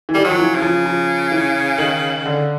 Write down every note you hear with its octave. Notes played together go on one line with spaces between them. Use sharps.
E3
D#3 G3
F#3
F3
E3
C#3
F3
F3
E3
D#3
D3